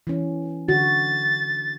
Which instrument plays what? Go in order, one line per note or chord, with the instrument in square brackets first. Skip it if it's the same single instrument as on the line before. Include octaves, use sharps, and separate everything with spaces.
[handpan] E3 C#4
[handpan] D3 F#4 [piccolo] A6